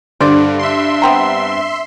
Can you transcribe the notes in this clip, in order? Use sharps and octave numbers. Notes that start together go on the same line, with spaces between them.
G2 D3 C5 D5
E5 C6
B3 C4 A#5